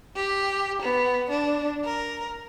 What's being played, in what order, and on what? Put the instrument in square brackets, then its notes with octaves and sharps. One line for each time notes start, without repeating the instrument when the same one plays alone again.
[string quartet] G4
B3
D4
A#4